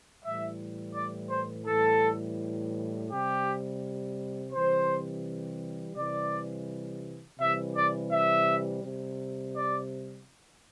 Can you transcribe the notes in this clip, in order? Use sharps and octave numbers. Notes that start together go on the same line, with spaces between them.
A2 E3 G3 E5
D5
C5
A2 E3 G3 A4
C3 G3 G4
C3 E3 G3 C5
C3 E3 G3 D5
C3 E3 G3 E5
D5
E5
C3 G3
D5